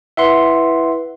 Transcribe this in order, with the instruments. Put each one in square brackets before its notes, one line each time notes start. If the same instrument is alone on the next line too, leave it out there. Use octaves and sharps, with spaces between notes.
[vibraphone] E4 B4 [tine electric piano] E5 F#5 C6